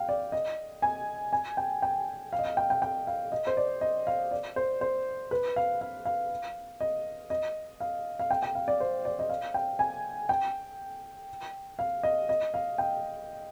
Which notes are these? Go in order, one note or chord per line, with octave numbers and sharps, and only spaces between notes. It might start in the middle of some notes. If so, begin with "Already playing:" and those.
Already playing: F5 G5
D5
D#5
G#5
G#5
G5
G5
F5
D#5
F5
G5
G5
G5
F5
D#5
C5
D5
D#5
F5
D5
C5
C5
B4
F5
F5
F5
D#5
D#5
F5
F5
G5
G5
F5
D5
C5
D5
D#5
F5
G5
G#5
G5
F5
D#5
D#5
F5
G5